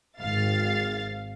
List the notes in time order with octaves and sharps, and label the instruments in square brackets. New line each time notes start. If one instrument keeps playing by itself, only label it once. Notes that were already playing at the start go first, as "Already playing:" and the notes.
[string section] G#1 F5 A6